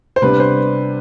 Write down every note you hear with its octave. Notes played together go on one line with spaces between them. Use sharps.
C5
C3 G3 B3 D4 B4
C5